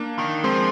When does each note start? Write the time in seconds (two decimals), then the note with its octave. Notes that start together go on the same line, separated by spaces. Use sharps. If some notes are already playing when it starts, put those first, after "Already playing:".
Already playing: A#3 D4
0.18 D#3
0.44 F3 G#3 C4